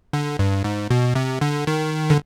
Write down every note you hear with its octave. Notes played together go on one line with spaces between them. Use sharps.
D3
G2
G#2
B2
C3
D3
D#3
D3